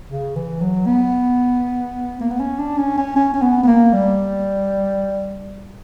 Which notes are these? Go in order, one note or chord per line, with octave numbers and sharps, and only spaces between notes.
C#3
E3
F#3
B3
A#3
B3
C#4
D4
C#4
C#4
C#4
C#4
B3
B3
A#3
G3